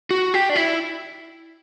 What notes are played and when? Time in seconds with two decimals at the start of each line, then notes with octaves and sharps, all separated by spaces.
0.11 F#4
0.34 G4
0.49 D4
0.56 E4